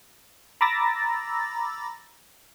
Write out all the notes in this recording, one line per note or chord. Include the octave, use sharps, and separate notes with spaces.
A#5 B5 D6 E6 A6 A#6